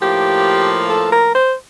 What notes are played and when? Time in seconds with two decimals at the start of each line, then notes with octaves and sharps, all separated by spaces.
0.01 A2 F3 A#3 G4
0.89 A4
1.12 A#4
1.33 C5